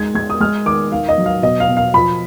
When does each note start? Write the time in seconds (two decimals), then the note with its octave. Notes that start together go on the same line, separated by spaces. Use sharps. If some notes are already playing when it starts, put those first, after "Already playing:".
Already playing: G#3 D#4 G#6
0.15 G#3 G#6
0.30 D#6
0.40 G#3 F6
0.66 D#3 D6
0.92 D#3 F5
1.09 D#5
1.18 F#3
1.26 F5
1.42 B2 D#5
1.60 F5
1.68 B2
1.77 F5
1.94 F3 B5